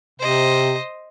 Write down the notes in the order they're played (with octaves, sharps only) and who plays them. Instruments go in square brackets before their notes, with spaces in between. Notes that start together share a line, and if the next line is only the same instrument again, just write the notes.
[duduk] C3 [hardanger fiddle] C5 D#5